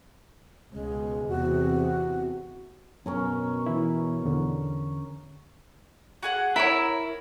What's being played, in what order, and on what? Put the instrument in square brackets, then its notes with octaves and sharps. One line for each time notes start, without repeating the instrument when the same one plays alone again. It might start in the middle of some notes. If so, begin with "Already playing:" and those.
[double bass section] C#2 B2 [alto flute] G#3
[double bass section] E2 C3 [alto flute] F#4
[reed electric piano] F#2 [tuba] B2 [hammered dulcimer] C#4 A#4 C#5
[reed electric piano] E3 E4
E2 D3
[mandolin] F#4 G#4 F#5
[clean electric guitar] E4 E5 [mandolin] A#4 C5 C#5